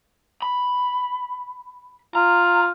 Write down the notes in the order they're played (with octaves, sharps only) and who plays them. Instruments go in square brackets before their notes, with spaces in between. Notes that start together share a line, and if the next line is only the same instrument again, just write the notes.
[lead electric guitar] B5
[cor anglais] F4 [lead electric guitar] A#5